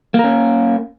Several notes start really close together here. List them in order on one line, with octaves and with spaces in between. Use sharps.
A#3 A#4 C#4